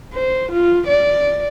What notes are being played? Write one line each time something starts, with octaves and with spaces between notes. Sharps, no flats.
C5
F4
D5